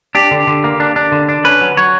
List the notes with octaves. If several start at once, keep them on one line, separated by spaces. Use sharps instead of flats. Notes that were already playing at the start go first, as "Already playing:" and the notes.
D4 G4
D3
D3
A#3
D4
D4
D3
D4
C#4 B4
F#3
F#3 C#5